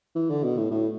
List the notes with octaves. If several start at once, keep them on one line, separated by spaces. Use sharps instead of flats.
E3
D3
B2
A2
A2